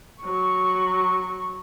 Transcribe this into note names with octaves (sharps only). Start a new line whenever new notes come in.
F#3 C#6